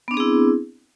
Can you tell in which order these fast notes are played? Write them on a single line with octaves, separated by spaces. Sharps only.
B3 D4 C4 G#4 E4